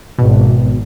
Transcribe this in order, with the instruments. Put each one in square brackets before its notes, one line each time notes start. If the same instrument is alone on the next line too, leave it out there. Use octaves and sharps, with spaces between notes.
[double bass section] G#1 [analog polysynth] B2